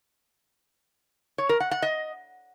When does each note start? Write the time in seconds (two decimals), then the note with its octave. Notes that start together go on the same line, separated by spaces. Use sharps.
1.38 C#5
1.49 A#4
1.60 F#5
1.71 F#5
1.82 D#5